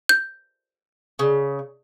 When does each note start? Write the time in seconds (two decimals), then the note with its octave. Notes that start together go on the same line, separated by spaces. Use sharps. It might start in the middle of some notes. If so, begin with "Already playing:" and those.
0.09 G6
1.19 C#3